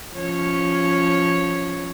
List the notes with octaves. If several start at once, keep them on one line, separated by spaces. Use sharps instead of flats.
F3 C#4 C#5